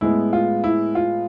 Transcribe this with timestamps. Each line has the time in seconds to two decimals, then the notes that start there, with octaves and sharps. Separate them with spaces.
0.01 A2 G#3 B3 E4
0.33 F4
0.64 E4
0.95 F4